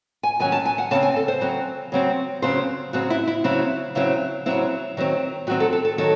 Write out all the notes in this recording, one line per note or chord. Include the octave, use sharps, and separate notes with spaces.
G#5
D#3 F#3 C#4 G#5
A5
G#5
F#5
C#3 F#3 C4 A5
G#5
A4
C5
C#3 F#3 C4
C#3 F#3 C4
C#3 F#3 C4 C5
C#3 F#3 C4 F#4
E4
E4
C#3 F#3 C4 E4
C#3 F#3 C4 E4
C#3 F#3 C4 E4
D#3 F#3 C4
D#3 F#3 C4 F#4
A4
A4
A4
D#3 F#3 A4